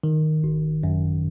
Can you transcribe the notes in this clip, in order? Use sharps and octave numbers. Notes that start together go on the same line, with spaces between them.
D#3
G#1
F#2